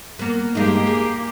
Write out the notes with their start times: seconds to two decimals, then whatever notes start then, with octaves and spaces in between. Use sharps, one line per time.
0.19 A#3 B3
0.55 G2 G#3 A#3 D#4 G4
0.87 G#4